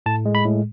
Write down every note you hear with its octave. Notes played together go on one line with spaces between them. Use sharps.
A2 A5
G#3
B5
A2